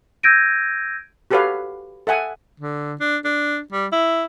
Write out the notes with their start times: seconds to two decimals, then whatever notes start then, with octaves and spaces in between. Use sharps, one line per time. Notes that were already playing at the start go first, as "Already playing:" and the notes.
0.23 E6 G6 G#6 A#6 D7 D#7
1.31 F#4 G4 A4 B4 C#5 F5
2.07 A4 E5 F#5 G#5
2.60 D3
3.00 D4
3.24 D4
3.72 G3
3.92 E4